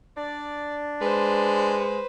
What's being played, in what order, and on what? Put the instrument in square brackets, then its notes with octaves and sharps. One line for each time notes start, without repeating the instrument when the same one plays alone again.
[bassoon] D4 [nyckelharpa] D5
[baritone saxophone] G#3 [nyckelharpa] B4 C5